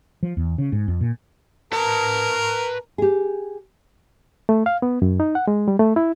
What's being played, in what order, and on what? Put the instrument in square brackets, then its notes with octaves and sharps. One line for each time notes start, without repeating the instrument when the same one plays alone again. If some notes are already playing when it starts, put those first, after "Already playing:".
[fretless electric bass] F3
E2
C#3
G#2
F2
A#2
[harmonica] A#4 [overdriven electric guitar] B4 A5
[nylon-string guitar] G4 G#4
[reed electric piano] A3
F5
B3
F#2
D#4
F#5
G#3
G3
A3
E4